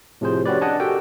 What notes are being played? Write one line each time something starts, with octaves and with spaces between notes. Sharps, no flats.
A2 C3 F3 G#4 C5
C#4 F#4 G4 B4 D5
D4 D#5 F#5 G#5 A5
F#4 G4 A4 A#4 G5